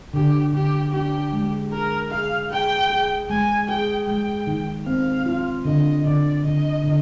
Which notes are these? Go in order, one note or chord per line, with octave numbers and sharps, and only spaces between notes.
D3 G4
D3 G4
D4 G4
G#3
G#4 A#4
G#4 F5
G#4 G5
G#4
G#3 G#5
G#4 G5
G#3 G5
D#3
C4 F5
F4
D3 D#5
D3 D5
D3 D#5
D3